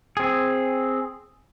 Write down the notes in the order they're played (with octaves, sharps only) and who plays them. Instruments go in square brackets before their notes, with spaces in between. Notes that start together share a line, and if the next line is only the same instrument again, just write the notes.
[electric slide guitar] C4 G#4